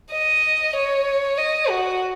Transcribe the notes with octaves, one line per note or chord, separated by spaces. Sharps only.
D#5
C#5
D#5
F#4